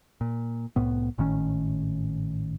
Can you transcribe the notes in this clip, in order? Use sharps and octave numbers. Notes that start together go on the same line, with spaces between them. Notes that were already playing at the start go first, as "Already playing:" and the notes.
A#2
C2 A2 B3
G#1 A2 D#3 C#4